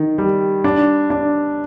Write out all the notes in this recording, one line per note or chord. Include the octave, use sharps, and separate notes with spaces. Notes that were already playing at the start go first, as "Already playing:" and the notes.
Already playing: D#3
G3
D4
D4